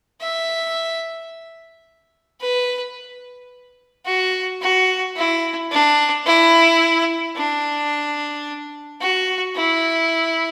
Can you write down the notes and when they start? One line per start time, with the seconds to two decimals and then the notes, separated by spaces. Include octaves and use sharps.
0.21 E5
2.41 B4
4.06 F#4
4.62 F#4
5.16 E4
5.71 D4
6.26 E4
7.36 D4
9.01 F#4
9.56 E4